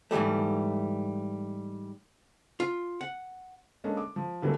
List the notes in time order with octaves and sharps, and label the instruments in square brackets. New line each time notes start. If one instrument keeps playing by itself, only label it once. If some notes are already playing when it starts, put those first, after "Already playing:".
[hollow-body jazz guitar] G#2 E3 F3 G3 A3
F4
F#5
[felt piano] G#3 A#3 C#4 D4 A4
D6
F3
D3 E3 F#3 G3 A3 A#3